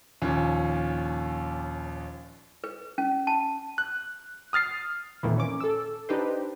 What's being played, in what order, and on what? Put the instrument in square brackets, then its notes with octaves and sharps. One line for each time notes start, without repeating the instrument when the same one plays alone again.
[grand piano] A#1 D#2 A#2 C#4
[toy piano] B4
C#4
A5
[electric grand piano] F#6
D#6 F6 A6 C7
[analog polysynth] F2 A#2 D#3 E3
C#4 D6
A4 E6
D4 D#4 G4 B4 C5